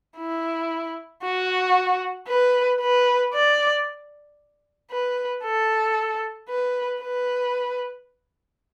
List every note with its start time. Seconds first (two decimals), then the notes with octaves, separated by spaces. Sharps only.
0.18 E4
1.23 F#4
2.28 B4
2.80 B4
3.33 D5
4.91 B4
5.44 A4
6.49 B4
7.02 B4